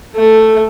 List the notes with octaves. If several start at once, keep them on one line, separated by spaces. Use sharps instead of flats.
A3